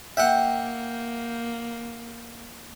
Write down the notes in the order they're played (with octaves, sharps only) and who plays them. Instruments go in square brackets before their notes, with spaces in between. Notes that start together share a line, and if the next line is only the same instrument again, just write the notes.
[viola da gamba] A#3 [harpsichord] E5 F#5 [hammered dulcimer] G5